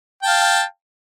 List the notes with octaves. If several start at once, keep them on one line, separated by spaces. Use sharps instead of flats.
F5 G5 A5